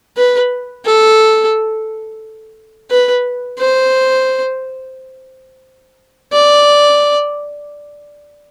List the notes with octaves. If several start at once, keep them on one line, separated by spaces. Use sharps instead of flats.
B4
A4
B4
C5
D5